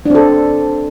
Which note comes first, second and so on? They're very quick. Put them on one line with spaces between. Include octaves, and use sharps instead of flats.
D4 C4 A4